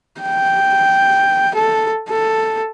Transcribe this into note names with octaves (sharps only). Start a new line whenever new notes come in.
G5
A4
A4